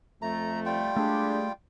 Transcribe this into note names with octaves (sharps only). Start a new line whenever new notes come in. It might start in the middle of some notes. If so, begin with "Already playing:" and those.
F2 A3 A#5
G3 F4 G5
G#3 A3 D4 G4 G#4